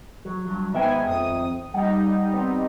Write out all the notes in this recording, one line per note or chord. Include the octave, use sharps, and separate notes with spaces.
F#3
G2 F#3
G#2 D#3 B3 E5 G5 G#5
F2 D#6
G3 D#4 F#5
B3 C4